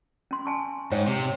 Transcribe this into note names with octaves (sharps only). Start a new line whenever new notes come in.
C#4 C6
G#5 A5 C#6
G#2 C5 C#5 G5
C3